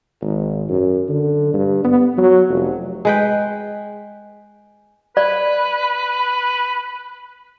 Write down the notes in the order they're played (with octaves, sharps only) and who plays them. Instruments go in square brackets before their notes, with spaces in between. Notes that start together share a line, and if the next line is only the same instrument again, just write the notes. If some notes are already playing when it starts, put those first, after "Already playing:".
[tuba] G#1
F#2
D3
G2
B3
F#3
F1
[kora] G#3 B4 G5
[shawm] B4 [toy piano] D5